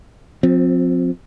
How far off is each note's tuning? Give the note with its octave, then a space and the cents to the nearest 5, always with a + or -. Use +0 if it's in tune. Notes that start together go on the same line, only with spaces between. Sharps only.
F3 +30 C4 +0